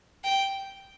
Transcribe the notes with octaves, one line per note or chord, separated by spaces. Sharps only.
G5